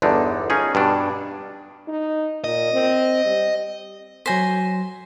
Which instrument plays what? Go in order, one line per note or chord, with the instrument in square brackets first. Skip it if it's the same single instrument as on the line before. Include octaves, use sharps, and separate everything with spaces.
[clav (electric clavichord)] G1 E2 D3 D4 D#4
C#4 D#4 F4 G#4
G2 B2 D4
[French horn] D#4
[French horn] A#2 [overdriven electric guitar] D#5
[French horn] C4
G3
[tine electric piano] F#3 A#6 B6 [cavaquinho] C5 G#5